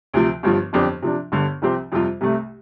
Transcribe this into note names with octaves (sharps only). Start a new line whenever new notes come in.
D2 C3 F3
G1 G2 F3
G1 F2 F3 D4 G4
C3 F3 D4
G1 G2 D3
C2 C3 F3 C4 G4
F2 C3 G3 F4
C2 C3 A3